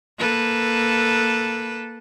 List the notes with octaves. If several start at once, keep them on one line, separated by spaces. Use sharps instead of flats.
A#3 A4 B4